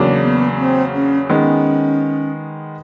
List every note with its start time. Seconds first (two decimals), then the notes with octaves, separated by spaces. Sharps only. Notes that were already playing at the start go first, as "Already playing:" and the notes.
Already playing: E2 C#3 F#3 A#3 D4
0.21 B3
0.57 C4
0.93 C#4
1.29 D#3 G#3 B3 C#4